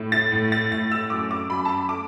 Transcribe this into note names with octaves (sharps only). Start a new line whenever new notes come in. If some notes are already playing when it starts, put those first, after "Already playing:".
Already playing: A2
A6
A2
A6
A2 A6
E6
F#2 D6
D6
F#2 B5
A5
B5
A3 D6